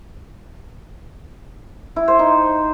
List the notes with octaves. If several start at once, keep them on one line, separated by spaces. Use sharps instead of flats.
E4
C5
D#4